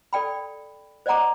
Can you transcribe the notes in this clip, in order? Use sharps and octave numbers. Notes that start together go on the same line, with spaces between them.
A4 D5 G5 B5
C5 D5 D#5 F#5 A#5 D6